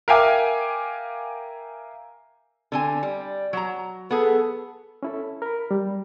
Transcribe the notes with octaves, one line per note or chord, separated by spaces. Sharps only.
A#4 E5 F5 G5 G#5 D6
D3 C4 G#5
G3
F#3 A#5
B3 G#4 A4
C#4 E4 A4
A#4 B5
G3